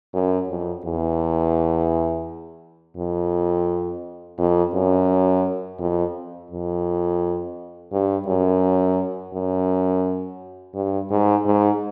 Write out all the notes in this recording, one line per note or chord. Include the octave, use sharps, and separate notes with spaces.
F#2
F2
E2
F2
F2
F#2
F2
F2
G2
F#2
F#2
G2
G#2
G#2